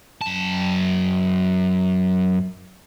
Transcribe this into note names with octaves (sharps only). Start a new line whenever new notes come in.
F#2 A5